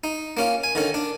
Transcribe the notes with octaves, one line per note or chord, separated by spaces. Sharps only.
D#4
A#3 C#4 F4
G#5
D3 D#3 C#4
D4